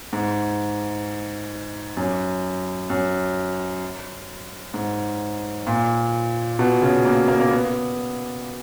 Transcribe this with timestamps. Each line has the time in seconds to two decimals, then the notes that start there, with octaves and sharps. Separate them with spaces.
0.13 G#2
1.97 F#2
2.90 F#2
4.74 G#2
5.67 A#2
6.59 B2
6.82 C#3
7.05 A#3
7.28 A#3
7.40 A#3
7.51 B3